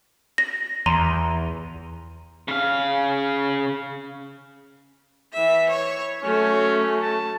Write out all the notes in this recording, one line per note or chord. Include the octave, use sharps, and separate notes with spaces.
A#6
E2 A#5 C6 D#7
C#3 F5
E3 E5
C#5
F#3 A3 C#4
A5